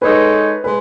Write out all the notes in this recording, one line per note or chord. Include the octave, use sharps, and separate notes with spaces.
G#3 D#4 A4 B4 C#5
G#3 B4